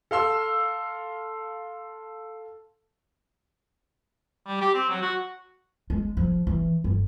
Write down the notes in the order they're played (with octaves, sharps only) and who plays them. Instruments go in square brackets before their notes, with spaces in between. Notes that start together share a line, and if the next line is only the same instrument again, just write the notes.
[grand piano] A4 F5 C6 E6
[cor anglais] G3
G4
C4
F#3
F#4
[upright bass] G#3
F3
E3
G1